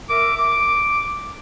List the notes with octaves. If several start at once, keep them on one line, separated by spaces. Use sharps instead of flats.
A#4 E5 D6
D6